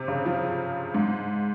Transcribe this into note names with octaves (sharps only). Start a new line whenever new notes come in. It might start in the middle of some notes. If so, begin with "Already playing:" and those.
Already playing: C3
C#3
F3
G#2